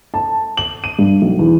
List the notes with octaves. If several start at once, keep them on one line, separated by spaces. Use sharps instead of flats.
A5
F#7
D#7
G2
B1
E2